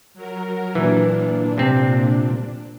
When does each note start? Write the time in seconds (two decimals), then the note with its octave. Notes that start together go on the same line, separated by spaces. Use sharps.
0.14 F#3 A#4
0.75 A#2 E3 D4
1.58 C3 C4